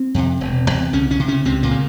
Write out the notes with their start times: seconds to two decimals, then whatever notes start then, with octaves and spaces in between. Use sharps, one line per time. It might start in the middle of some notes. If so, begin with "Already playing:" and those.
Already playing: C4
0.14 F2 C3
0.41 E1
0.67 E2 C3
0.93 C2 C#3 C#4
1.10 C#3 C#4
1.20 C3
1.28 C#3 C#4
1.45 C#2 C3 C4
1.63 A#2 A#3
1.71 C#3